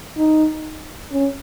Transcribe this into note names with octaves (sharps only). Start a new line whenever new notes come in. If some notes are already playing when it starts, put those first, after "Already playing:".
D#4
C#4